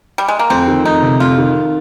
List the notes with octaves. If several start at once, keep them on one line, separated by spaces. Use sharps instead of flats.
G3
G#3
A#3
F2 C4
D#3
F2 D#4
C3
F2 F4
D#3